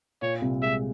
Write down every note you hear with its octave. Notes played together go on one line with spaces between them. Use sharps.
A#2 C#5
C2
G#3 E5